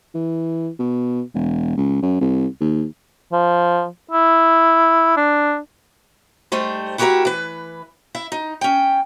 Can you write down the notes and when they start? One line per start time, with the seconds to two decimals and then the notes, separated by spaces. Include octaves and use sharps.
0.15 E3
0.79 B2
1.34 E1
1.77 C#2
2.02 F#2
2.21 C2
2.60 D#2
3.32 F3
4.11 E4
5.17 D4
6.52 G#2 G3 A3 C5
6.98 E4 F#4 G4 A4 A#4 E5
7.25 E3 B4
8.15 E4 E5
8.32 D#4
8.61 C#4 G5